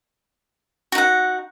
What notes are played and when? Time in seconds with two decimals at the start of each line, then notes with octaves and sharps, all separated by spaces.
0.92 F#4
0.95 D#4
0.98 F#5